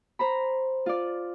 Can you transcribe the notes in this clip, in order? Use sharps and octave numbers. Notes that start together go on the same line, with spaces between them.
C5 A#5 B5
F4 D5